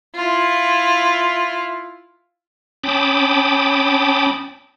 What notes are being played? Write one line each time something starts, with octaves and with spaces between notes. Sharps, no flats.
E4 F4
C#4 G5 A5 B5 D6 D#6